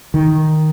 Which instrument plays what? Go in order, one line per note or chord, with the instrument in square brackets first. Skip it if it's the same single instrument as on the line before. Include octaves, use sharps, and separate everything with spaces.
[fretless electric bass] D#3